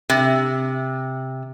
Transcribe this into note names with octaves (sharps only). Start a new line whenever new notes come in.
C3